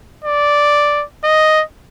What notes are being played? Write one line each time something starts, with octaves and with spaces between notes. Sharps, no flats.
D5
D#5